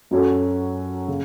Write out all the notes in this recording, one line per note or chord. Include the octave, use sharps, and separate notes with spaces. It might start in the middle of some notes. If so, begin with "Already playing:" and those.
F#2 F#3 C#4 F#4 A4
C#3